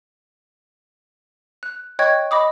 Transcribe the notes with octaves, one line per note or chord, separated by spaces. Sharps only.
F#6
C#5 D#5 G5 C#6 F#6 G#6
D#5 B5 D6 D#6